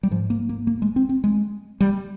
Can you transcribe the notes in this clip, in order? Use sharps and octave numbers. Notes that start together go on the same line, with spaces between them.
G3
G#2 F3
A#3
A#3
A#3
G#3
C4
C4
G#3
G3